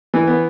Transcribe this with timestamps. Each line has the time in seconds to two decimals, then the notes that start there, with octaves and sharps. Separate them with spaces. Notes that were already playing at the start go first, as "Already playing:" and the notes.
0.14 E3
0.27 B3